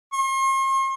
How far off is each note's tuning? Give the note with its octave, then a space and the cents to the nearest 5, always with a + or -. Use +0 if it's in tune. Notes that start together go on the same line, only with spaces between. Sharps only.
C6 +45